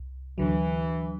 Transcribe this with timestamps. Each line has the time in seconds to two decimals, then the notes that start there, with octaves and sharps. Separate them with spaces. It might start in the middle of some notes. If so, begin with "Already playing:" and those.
Already playing: C2
0.38 D2 D3 E3 F#3